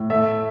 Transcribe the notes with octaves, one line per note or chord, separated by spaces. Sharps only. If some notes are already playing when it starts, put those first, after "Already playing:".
Already playing: A2
A3 E5